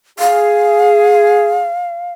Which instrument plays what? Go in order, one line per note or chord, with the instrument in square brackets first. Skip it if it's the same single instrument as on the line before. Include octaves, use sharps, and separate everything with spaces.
[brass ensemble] G#4 [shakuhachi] F5